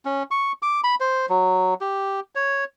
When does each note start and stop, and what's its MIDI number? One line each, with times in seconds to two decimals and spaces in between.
0.05 0.23 61
0.31 0.52 85
0.62 0.81 86
0.84 0.95 83
1.00 1.26 72
1.29 1.74 54
1.81 2.20 67
2.35 2.64 73